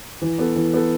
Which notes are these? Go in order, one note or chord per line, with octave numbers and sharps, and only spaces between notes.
E3
B3 A4
E3
B3 A4